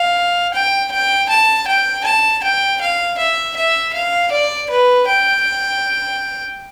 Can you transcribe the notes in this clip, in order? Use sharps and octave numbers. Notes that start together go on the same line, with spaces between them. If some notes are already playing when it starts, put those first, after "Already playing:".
Already playing: F5
G5
G5
A5
G5
A5
G5
F5
E5
E5
F5
D5
B4
G5